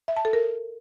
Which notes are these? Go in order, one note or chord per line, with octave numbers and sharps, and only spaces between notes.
E5
A5
A4
A#4